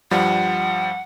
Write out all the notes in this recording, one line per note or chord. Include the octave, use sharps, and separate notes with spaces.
G2 F3 G3 F#5